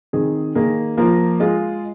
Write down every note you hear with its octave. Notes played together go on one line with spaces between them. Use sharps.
D#3 C4 G#4
D#3 A#3 G#4
F3 A#3 F4 A#4
G#3 F4 G#4